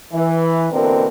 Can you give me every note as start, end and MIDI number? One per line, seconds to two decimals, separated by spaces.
0.13 0.66 52
0.70 1.07 47
0.70 1.07 50
0.70 1.07 52
0.70 1.07 58
0.70 1.07 60
0.70 1.07 70